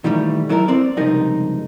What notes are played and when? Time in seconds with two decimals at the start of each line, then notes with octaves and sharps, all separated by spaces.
0.04 A#2 D#3 E3 G3 A3
0.49 F#3 E4 A4 A#4
0.68 C4 D5
0.97 C#2 G2 C3 F3 D#4 A#4